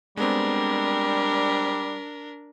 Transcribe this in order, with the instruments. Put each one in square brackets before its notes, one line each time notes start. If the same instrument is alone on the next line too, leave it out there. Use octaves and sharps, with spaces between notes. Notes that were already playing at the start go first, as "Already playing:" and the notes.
[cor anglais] G3 [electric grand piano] G#3 B3 C4 [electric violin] D4 A#4